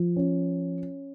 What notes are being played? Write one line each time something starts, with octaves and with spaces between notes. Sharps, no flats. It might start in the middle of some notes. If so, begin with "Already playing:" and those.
Already playing: F3
C#4